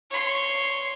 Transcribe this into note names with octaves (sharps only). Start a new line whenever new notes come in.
C#5 C6